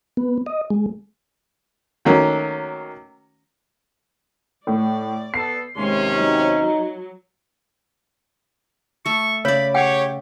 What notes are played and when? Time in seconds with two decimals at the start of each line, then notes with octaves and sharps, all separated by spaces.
0.17 B3
0.46 D#5
0.70 G#3
2.05 D#3 F#3 A3 A#3 C#4
4.67 A2 D5
5.34 B3 A4 C7
5.76 D#2 C3 G#3 C#4 C6
6.17 F#3 D#4
9.05 A3 A4 C#6
9.45 C#3 C#5 D5 B5
9.75 G4 C#5 F#5 G5